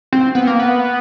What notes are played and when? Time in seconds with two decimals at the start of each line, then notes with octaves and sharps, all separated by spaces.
0.12 C4
0.35 B3
0.47 A#3
0.60 B3